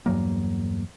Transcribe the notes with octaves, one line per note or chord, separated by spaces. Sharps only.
E2 G2 F#3 A#3